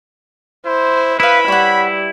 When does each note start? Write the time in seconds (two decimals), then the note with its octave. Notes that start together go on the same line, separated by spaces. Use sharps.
0.66 E4 C5
1.20 E4 B4 F5 B5 D#6
1.48 G3 C#5 F#5